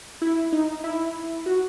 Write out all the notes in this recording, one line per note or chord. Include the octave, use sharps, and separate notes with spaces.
E4
D#4
E4
F#4